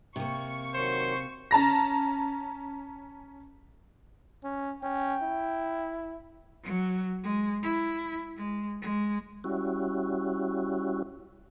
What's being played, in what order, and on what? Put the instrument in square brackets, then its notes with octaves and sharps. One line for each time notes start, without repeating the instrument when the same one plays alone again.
[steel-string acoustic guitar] C3 A#3 [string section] C#6
[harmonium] D#3 F#3 [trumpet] C5
[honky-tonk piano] C#4 A5 A#5 A#6
[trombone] C#4
[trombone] C#4 [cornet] G5
[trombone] E4
[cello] F#3
G#3
E4
G#3
G#3
[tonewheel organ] G3 C#4 E4 F#4